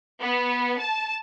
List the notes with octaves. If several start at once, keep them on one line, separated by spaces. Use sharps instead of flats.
B3
A5